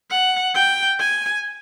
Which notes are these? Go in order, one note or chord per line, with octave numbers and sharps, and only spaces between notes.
F#5
G5
G#5